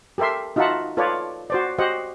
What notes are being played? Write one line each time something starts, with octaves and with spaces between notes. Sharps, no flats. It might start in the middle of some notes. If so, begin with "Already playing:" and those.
G4 A4 A#4 E5 C6
D#4 F4 F#4 E5 F#5 A5
F4 A4 B4 C#5 D5
F#4 C5 D5
F#4 G4 C5 D#5 F#5